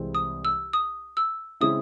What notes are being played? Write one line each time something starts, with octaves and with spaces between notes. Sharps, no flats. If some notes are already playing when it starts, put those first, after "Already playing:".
Already playing: C2 C3 E3 G#3 C4
D#6
E6
D#6
E6
C#3 G#3 C4 E4 D#6